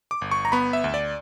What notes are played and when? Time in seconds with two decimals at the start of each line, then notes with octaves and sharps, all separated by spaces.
0.11 D6
0.21 G1
0.31 C#6
0.45 A#5
0.52 B3 B5
0.73 E5
0.84 D2
0.94 D5